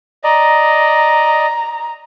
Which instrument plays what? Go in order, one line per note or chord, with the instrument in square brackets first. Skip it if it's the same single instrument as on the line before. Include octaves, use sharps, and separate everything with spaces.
[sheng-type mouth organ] D5 D#5 [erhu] A#5